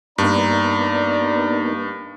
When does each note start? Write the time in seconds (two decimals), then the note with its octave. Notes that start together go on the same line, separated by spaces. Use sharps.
0.18 G2 A#3 B3 D4 D#4 D5 A#5